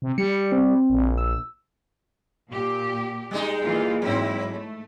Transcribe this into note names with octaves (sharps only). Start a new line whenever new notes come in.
C3
G3 C#7
C4
A#1
E6
A#2 G4
G3 G#3 D#4
E3 A#3 F4
G#2 F#3 C4 E4
A3